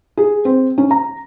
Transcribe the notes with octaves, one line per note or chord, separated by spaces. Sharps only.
G#4
C4
C#4
A#5